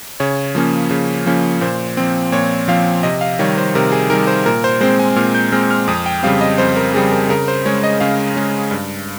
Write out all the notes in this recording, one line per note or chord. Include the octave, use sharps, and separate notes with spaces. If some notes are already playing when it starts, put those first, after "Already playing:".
C#3 C#5
F3 A#3 C#4
C#3
F3 A#3 C#4
A#2 C5
F3 C4
A#2 C#5
F3 C4 F5
C3 D#5
F5
D#3 G3 C#5
C5
C3 A#4
G#4
D#3 G3 A#4
C5
A#2 A#4
C5
G#3 C4 C5
G#5
A#2 F6
G6
G#3 C4 F6
F6
F2 D#6
G5
C#3 G3 C4 F5
D#5
F2 C5
A#4
C#3 G3 C4 G#4
A#4
C#3 A#4
C5
G#3 C#4 C#5
D#5
C#3 F5
G#3 C#4
G2